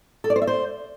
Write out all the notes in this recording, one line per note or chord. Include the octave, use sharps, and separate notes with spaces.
A4
D5
C5
E5
C5